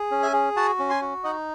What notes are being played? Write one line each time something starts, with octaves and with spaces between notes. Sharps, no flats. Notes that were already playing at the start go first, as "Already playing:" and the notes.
Already playing: G#4
C#4
E5 G#5
G#4
F#4 F#5 A5
C#4
G#5 C6
F#4
D#4 D#5 F#5